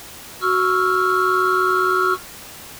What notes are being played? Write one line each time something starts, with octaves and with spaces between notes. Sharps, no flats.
F#4 C#6 E6 F6